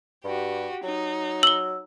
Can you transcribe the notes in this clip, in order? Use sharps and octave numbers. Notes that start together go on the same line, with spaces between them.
G2 F#4 G4
F#3 D#4
E6 F#7 G7